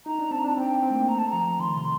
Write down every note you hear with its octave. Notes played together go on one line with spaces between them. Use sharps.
D#4 A#5
D4
C4 A5
A#5
D4 A5
C4 G5
C4
A3
A#3
A3 A#5
A5
F3 A#5
D#3 C6
C3